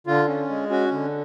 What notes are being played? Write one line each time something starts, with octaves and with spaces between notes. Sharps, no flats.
D3 F4
C#4
G#3
C#4 F#4
D3